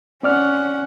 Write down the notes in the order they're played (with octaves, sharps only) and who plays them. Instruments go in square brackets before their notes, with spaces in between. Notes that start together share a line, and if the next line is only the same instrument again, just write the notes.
[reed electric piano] C4 D5 F6 [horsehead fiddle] C#4 F#5